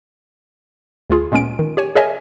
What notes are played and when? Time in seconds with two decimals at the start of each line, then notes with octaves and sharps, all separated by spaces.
1.10 D2 E4 F4 G#4
1.32 A#2 G#3 B3 C#4 D7
1.59 D#3
1.77 G4 C#5 G#5
1.95 G#4 A#4 C#5 D#5 E5 G#5